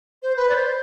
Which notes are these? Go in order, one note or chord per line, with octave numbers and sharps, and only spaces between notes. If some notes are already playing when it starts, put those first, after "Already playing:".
C5
B4
D5
C5